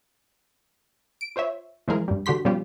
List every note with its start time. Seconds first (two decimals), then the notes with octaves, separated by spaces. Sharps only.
1.21 D7
1.36 F4 C5 C#5 E5
1.88 E3 F3 G#3 G#4 A#4
2.08 G2 G3
2.26 D3 F#4 G4 C6 B6
2.45 B2 F3 G3 C#4 F4 G4